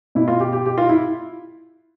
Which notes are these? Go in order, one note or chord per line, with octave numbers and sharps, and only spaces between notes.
B2 E4
F4
G4
G4
G4
F4
E4